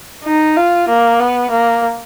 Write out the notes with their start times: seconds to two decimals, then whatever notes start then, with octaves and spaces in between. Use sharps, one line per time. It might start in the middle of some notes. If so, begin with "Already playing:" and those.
0.24 D#4
0.56 F4
0.89 A#3
1.19 B3
1.50 A#3